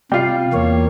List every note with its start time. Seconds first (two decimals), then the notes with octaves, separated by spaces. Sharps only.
0.12 C3 G3 F4 F5 G5
0.53 E2 A#3 C#5